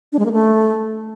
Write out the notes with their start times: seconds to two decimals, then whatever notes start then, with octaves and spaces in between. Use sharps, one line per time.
0.12 D4
0.19 G#3
0.26 A#3
0.32 A3